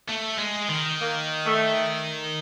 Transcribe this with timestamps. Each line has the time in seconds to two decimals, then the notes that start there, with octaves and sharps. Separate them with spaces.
0.09 A3
0.39 G#3
0.70 D#3
1.01 A#3
1.46 A3